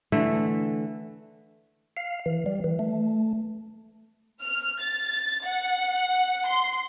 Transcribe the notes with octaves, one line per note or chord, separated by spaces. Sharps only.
D3 E3 A3
F5
E3
G3
E3
A3
F6
A6
F#5
C6